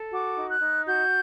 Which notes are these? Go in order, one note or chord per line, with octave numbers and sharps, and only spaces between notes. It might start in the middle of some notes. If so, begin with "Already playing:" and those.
Already playing: A4
F#4 D6
D#4
F#6
D#4
F#4 G6